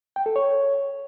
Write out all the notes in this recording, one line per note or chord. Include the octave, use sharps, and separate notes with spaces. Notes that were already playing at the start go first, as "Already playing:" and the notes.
G5
A4
C#5